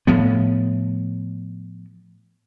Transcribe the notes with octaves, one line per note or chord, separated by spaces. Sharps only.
A2 F3 B3